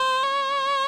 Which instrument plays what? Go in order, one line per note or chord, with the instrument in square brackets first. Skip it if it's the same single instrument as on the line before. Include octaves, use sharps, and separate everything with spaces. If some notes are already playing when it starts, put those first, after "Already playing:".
Already playing: [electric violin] C5
C#5